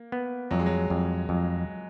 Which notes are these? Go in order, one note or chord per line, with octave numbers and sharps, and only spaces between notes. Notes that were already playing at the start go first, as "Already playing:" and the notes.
Already playing: A#3
B3
F2 F#3
G#3
F#3
F2
F2